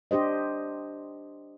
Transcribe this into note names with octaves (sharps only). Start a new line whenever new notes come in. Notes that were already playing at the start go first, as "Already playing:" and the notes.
D4 G4 C5 D#5